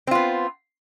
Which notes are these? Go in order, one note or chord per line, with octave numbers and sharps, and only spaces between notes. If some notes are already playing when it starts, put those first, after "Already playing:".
B3 C4 F4